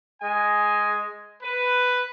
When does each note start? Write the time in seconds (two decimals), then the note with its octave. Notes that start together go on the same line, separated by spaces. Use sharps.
0.21 G#3 G#5
1.43 B4